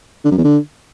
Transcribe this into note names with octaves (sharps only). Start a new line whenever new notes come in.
D3
F#2
E2
D3